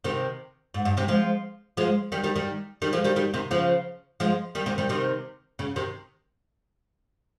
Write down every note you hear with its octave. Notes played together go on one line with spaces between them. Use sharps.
C3 D#3
G#2
G2
C3 D#3
F3 G#3
F3 G#3
D#3 G3
D#3 G3
D#3 G3
D#3 G3
F3 G#3
D#3 G3
D#3 G3
C3 D#3
C#3 F3
F3 G#3
D#3 G3
C3 D#3
D#3 G3
C3 D#3
C#3
C3 D#3